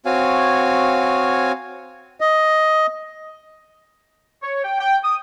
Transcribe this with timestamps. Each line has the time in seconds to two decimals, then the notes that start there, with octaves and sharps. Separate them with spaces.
0.05 C4 F#4 C#5 F5 G#5
2.21 D#5
4.42 C#5
4.64 G5
4.80 G5
5.03 D#6